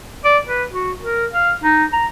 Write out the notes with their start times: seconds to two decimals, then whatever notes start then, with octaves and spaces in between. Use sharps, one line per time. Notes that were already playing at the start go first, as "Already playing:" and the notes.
0.25 D5
0.47 B4
0.72 F#4
1.00 A#4
1.32 F5
1.63 D#4
1.92 A#5